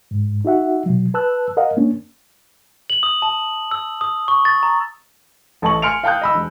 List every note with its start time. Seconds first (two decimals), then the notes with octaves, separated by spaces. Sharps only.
0.11 G#2
0.45 D#4 F#4 E5 F#5
0.86 B2 F#3
1.14 B4 A5 E6 F#6
1.57 A#4 D#5 F5 F#5
1.77 A#3 C#4 D4
2.90 F#7
3.03 D#6
3.22 A5
3.71 E6
4.01 D#6
4.28 C#6
4.45 A6
4.63 A#5
5.62 A1 A4 D#5 A5 C#6 F#7
5.82 G#5 C6 F6 C#7 D7 F7
6.04 F5 G5 A5 D#6 F#6 G6
6.21 D#5 B5 E6
6.34 E1